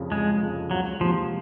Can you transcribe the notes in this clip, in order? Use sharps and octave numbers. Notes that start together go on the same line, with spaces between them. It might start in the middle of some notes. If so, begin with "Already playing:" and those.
Already playing: F1 F2 C#3 F3
F1 G#3
F2 C#3 F3
C#2 F#3
C3 D#3 F3 A#3